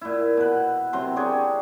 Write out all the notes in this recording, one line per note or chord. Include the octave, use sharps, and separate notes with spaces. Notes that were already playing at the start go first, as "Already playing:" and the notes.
A#2 E4
B2 B4
C3 F#3 A#5 C6
D4 G4 G#4 C#5